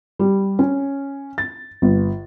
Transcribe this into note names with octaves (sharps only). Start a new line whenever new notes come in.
G3
C#4
A6
G1